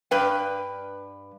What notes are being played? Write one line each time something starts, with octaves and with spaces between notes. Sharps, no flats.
G2 B4 G5